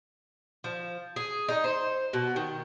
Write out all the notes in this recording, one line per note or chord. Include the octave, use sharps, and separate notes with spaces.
F3
G#4
D#4
C5
B2
D#3